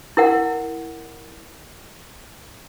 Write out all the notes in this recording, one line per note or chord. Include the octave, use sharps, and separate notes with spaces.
E4 A#4 F#5